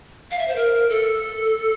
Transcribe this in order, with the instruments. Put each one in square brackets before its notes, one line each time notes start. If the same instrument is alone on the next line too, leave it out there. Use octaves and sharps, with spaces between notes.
[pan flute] F5
E5
C5
A#4
A4